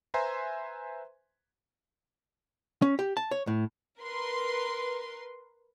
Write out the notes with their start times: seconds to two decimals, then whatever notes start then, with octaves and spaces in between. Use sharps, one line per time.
0.14 B4 C5 E5 G#5 A#5 C6
2.82 C#4
2.99 G4
3.17 A5
3.31 C#5
3.47 A2
3.99 A#4 B4 C6